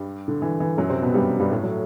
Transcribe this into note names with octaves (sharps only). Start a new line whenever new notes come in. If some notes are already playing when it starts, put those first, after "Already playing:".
Already playing: G2 G3
D3
E3
E3
F#2 F#3
C3 C4
B2 B3
G2 G3
G2 G3
A2 A3
F#3